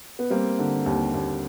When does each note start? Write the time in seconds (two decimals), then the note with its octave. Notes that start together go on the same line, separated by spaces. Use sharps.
0.19 B3
0.30 G3 A#3 C4
0.59 D3
0.86 D#2
1.14 D#2